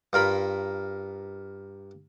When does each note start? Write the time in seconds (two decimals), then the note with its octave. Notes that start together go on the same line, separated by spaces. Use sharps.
0.13 G2 F4 A#4 B5